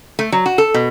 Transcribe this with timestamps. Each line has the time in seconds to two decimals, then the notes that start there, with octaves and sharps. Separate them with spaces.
0.19 A3
0.32 F#3
0.46 F#4
0.58 A4
0.74 B2